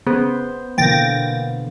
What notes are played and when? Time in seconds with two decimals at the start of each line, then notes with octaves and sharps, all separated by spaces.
0.07 C#3 B3 C5
0.78 B2 D3 E3 A#3 G5 A6 A#6